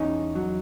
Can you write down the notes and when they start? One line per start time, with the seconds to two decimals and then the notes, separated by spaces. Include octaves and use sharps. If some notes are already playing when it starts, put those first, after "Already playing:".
Already playing: E2 C#4 D#4
0.35 F#3